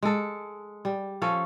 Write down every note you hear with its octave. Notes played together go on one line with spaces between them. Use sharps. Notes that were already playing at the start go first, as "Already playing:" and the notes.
G#3 A4
G3
F3 C#4 A4